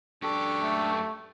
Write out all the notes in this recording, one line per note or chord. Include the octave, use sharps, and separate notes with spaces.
F#2 D4 G4 A4 C#6
A3